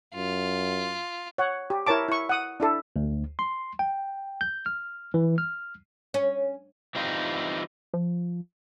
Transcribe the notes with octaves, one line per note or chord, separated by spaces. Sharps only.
F#2 F4
C#5 F#5
G4
E4 A#4 C#5 A5 D6
E4 C#6
F#5 D#6
D4 E4 A4
D2
C6
G5
G6
F6
E3
F6
C#4
E3 G3 C4 D#4 F4
F3